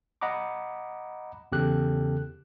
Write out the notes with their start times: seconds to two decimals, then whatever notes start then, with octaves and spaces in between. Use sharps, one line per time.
0.21 D#5 F#5 A#5 B5 D6
1.52 E2 C#3 G4 A4 F#6